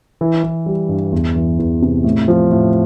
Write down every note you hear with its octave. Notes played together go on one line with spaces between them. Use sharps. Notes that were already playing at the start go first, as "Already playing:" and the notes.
E3
E3
G3
G2
E2
E3
E2
C3
A2
F3
A2